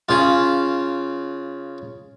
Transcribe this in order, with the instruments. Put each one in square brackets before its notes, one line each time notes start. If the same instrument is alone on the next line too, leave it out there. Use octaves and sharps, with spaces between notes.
[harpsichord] C#3 F4